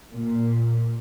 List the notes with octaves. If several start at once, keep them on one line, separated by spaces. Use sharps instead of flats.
A#2